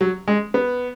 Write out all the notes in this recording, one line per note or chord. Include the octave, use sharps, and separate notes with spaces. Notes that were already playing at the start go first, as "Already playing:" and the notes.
F#3
G#3
B3